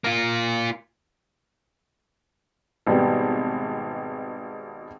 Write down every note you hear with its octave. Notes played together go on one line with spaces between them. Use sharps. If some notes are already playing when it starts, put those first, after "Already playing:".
A#3 F4
G#1 B2 G3